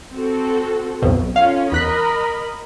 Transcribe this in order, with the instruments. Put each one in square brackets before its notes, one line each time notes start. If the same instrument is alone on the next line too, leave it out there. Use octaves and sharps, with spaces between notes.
[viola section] C4 F#4 A4
[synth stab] B1 F2 B2
[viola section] C#4 F4 A4 [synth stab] F5
[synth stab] E2 F#6 B6 [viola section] A#4 D#5 B5